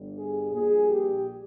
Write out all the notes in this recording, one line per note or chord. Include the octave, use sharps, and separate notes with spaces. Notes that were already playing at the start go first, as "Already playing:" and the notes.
Already playing: G1 G2 G3
G#4
A#1 A#2 G3 G#4
G4